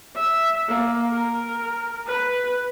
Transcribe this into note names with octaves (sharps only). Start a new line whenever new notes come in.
E5
A#3
A#4
B4